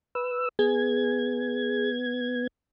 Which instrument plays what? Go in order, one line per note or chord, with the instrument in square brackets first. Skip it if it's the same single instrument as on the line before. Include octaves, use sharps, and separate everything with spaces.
[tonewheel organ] B4 E6
[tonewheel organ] B3 G#6 [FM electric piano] G#4